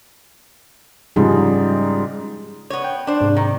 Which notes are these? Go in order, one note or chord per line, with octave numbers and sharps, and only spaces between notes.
G#2 C#3 F3 G3 D#4 G#4
B3 C#5
G5
D4 C5
G#2 C3
D#3